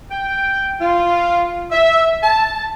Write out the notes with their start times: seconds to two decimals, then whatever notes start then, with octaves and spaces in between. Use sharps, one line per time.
0.11 G5
0.80 F4
1.72 E5
2.23 A5